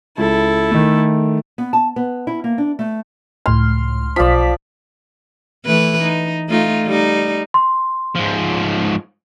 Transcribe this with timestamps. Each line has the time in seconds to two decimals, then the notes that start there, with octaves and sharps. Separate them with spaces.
0.18 C#2 E4 A4
0.71 D#3 A3
1.58 B3
1.73 A5
1.96 B3
2.27 E4
2.44 A#3
2.58 D4
2.79 A3
3.46 C#2 A2 C6 F6
4.16 B1 F3 D5 F5 B6
5.65 E3 A3 B4
6.02 D#4
6.48 A3 D#4 F4
6.85 G3 D#4
7.54 C6
8.16 G#2 F3